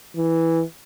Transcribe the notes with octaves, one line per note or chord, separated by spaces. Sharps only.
E3